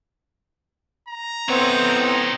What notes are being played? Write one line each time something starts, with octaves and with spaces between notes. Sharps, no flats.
A#5
A2 B3 C4 D#4 C#5